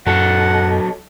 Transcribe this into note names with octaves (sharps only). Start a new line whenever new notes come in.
F#2 F#3 A4 F#5